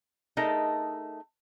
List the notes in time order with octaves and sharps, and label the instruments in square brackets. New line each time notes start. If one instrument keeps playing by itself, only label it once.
[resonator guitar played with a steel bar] A3 D#4 G#4 A#4 D#5 A5